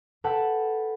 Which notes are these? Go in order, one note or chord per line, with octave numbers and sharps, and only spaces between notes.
A4 B4 F#5 G5 A5